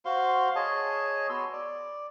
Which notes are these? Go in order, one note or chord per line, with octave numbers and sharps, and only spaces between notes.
F#4 C5 F5 C6
G#4 C#5 D#5 A5
B3 F#4 C6 E6
D5